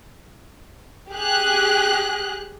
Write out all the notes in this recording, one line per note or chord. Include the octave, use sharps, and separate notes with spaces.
G4 G#4 F#6